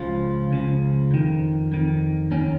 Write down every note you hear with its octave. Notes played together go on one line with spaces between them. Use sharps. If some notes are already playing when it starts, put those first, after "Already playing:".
Already playing: C#2 C#3 F3 F4
C#2 C#3 F3
F2 D#3
F2 D#3
D#2 D#3 C#4